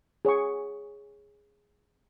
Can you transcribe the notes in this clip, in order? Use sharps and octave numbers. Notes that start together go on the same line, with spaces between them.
G#4 C#5 F#5 C#6